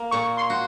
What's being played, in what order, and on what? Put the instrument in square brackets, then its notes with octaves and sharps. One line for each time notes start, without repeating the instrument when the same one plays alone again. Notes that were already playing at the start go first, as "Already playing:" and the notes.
Already playing: [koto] A#3
[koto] A#2 [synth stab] C#6
[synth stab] C6
[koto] F#4